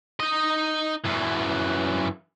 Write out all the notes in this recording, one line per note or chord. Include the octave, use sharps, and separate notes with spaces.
D#4 D#5
F#2 E3